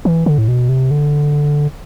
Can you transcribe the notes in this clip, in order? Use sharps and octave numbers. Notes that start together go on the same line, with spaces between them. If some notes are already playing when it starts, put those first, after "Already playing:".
E3
D3
A2
B2
C3
D3